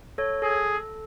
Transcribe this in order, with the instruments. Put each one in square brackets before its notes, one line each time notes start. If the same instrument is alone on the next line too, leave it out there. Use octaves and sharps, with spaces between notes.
[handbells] A4 C#5
[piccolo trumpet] G#4 [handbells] A4